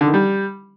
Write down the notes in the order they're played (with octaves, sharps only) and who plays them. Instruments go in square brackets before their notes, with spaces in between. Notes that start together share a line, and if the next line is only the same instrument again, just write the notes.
[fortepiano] D3
D#3
G3